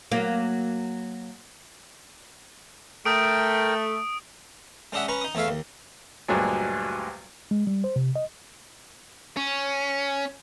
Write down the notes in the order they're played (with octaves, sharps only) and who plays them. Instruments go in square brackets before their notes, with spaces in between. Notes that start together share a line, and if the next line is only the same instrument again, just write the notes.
[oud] F#3 A#3
[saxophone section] A3 [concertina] A#4 G5 [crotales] D#6 D7
[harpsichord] G#3 C#4 D4 D#5 E5 F#5
C#4 B4 A#5 C#6
D#4 D#6
E2 A3 C#5 E5 F5
D#2
[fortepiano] D2 G2 A#2 F#3 G#3
[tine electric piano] G#3
G3
C5
C3
D#5
[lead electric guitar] C#4